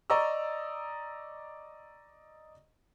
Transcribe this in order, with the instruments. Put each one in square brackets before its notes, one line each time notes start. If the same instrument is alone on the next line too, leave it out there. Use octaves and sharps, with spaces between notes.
[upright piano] D5 D#5 A#5 C#6 E6